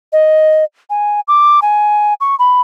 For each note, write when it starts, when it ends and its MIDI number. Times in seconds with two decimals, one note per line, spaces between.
0.13 0.64 75
0.90 1.20 80
1.28 1.60 86
1.62 2.14 80
2.21 2.36 85
2.39 2.61 83